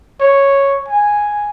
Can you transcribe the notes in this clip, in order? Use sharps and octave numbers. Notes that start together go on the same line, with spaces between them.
C#5
G#5